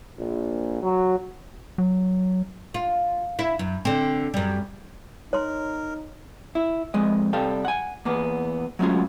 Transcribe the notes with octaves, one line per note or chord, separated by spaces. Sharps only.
A#1
F#3
F#3
F4
E4
F#2
D3 C4
F#2 G3
D#4 A#4 C#5 C6
E4
F2 G#3 D#5
C3 G3 A4 F5 G5
F#5 G#5
E2 A#3 B3
F#3 G#3 A3 C#4 F4 F#4